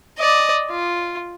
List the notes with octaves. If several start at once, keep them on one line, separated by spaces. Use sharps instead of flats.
D5 D#5
F4